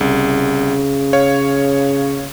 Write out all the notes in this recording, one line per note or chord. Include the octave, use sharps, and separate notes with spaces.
C2 C#3
C#5 F5